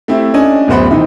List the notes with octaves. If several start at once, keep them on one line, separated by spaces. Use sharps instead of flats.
A3 C4 E4 G4
C#4 D4 D#5 G#5
D1 F#2 B3 C5 F#5 B5
D#3 E3 D#4